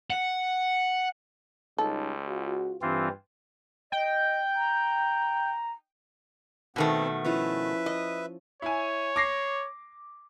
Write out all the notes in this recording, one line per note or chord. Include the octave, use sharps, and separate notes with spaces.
F#5
C#2 G3 C#4 D#4 A4
F4 F#4
G2 E3 C4 F4
D#5 G5
A#5
B2 D#3 A3 B3 C4
F3 C#4 E4 B4 E5
D#5
E4 C#5 G#5
D6 A#6 C7